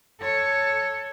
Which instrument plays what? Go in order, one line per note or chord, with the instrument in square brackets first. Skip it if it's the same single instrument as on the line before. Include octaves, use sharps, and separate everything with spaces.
[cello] A4 C#5